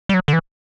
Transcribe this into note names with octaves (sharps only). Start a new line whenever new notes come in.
G3
F#3
D3
E3